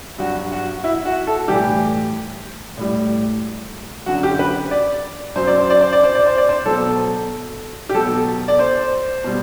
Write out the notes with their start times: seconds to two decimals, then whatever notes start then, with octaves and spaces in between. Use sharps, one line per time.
0.18 G2 F#3 F#4
0.52 F#4
0.84 E4
1.05 F#4
1.27 A4
1.48 A2 E3 G3 G4
2.77 A2 G3
4.06 F#2 D3 F#3 F#4
4.23 G4
4.39 B4
4.71 D5
5.36 F#2 F#3 C5
5.47 D5
5.58 C5
5.70 D5
5.81 C5
5.93 D5
6.04 C5
6.15 D5
6.26 C5
6.38 D5
6.49 C5
6.66 B2 F#3 A4
7.89 G4
7.94 B2 F#3 A4
8.48 D5
8.59 C5
9.24 B2 G3